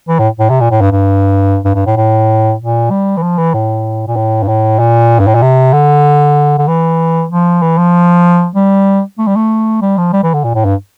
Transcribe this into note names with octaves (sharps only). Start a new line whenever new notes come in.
E3
A2
A2
C3
A#2
A2
G2
G2
G2
G2
A2
A2
A#2
G3
E3
F3
E3
A2
A#2
A2
G2
A2
A#2
G2
A2
A#2
C3
D3
D3
E3
F3
E3
F3
G3
A3
G3
A3
G3
F3
G3
E3
D3
A#2
A2
G2